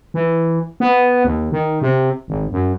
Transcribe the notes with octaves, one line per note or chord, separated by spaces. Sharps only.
E3
B3
D#2
D#3
C3
G#1
F#2